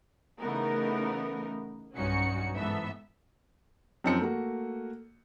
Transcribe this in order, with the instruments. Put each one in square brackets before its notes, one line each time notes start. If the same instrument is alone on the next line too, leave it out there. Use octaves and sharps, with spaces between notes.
[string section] C#3 E3 A3 B3 D#4 A#4
B1 G2 C#4 D#4 F#4 C#7
G#2 E3 B3 A4 E5
[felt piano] F#2 F3 C4 D#4 A5 C#7
A3 A#3 F#4